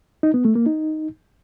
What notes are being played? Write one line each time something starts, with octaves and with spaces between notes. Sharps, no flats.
D#4
B3
A3
A#3
D#4